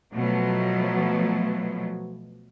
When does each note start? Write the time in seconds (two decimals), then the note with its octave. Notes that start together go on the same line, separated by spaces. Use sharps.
0.13 B2 F3 F#3 A3